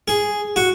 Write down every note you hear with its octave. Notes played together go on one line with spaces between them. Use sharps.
G#4
F#4